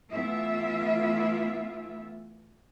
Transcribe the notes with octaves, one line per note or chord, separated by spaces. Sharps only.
E3 A3 B3 E4 F4 E5